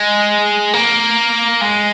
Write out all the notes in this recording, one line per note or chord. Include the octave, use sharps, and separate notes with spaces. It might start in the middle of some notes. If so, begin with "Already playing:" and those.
Already playing: G#3
A#3
G#3